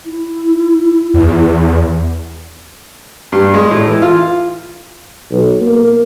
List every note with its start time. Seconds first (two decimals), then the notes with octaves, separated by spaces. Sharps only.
0.06 E4
1.14 E2
3.32 G2
3.54 G#3
3.71 A2
3.88 E3
4.02 F4
5.31 B1
5.61 A#3